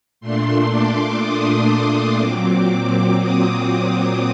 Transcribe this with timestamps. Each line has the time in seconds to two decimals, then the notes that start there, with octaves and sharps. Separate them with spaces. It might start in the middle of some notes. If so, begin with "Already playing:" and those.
0.21 A#2 A3 D4 C6
0.70 D6
1.19 D#6
1.68 D#6
2.17 A#2 F#3 C4 D6
3.16 D#6